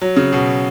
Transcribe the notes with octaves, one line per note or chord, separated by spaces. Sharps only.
F#3
C#3
B2